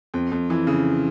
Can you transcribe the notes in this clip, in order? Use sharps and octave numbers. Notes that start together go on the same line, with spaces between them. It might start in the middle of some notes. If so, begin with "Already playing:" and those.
F2
F2
E3
C#3